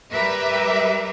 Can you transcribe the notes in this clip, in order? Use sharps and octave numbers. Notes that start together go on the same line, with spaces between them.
G3 G4 A#4 B4 E5